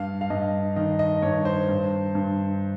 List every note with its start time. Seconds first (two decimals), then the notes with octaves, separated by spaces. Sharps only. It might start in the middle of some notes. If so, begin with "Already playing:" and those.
Already playing: G2 F5
0.21 F5
0.30 G2 D#5
0.76 D#3 D#5
0.99 D#5
1.22 G2 C#5
1.45 C5
1.69 G2
2.15 G2